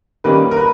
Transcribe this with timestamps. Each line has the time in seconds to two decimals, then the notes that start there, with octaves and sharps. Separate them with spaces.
0.24 D#3 G3 A#3 C#4 B4
0.51 A#4
0.57 B4